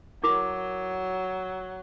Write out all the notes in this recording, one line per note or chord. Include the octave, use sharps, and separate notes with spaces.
F#3 E4 A#4 D6